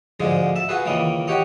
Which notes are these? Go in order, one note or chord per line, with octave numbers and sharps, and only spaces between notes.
D2 G#2 D3 F3 G#3 G#4
E5 A5
F4 F#4 G#4 B4
C#2 D#3 E3 A#3 D#5
F#4 G4 C#5 D#5